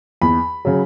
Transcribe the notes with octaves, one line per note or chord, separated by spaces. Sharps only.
E2 B5
C#3 F#3